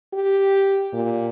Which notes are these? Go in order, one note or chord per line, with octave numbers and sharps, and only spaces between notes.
G4
A#2